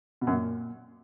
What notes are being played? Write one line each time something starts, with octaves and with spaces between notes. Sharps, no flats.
B2
F#2
A#2